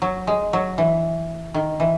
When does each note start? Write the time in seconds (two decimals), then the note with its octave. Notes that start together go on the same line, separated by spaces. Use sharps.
0.02 F#3
0.27 G#3
0.53 F#3
0.78 E3
1.54 D#3
1.80 E3